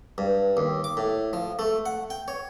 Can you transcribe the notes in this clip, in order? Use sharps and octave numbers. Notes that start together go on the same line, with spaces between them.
G2
D#2
D6
A2
F3
A3
F#5
G5
C#5